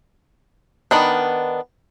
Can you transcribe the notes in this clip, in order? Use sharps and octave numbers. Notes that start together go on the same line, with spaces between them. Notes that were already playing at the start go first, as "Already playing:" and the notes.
D#3 B3 D4